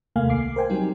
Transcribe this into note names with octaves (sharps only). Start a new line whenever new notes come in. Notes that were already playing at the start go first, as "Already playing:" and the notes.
D#2 C3 A3 A#3 F5 G#5
C2 D6 C7
A#4 C5 G5 G#5
F#3 G3 C4 D#4